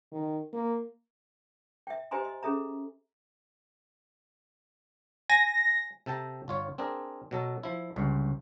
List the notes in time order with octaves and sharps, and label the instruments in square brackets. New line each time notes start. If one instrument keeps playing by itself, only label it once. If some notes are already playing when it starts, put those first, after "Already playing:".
[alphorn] D#3
A#3
[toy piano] E5 G5
G4 C5 D#5 G#5 A#5 C6
D#5
C#4 G#4 A4 E5 A#5
[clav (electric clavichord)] G#5 [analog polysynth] A#6
[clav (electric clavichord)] C3 A4 G5 A5 A#5
G1 F4 C#5
C4 D4 G#4 A#4
B2 F#3 A4
F3 E4
G1 C#2 G2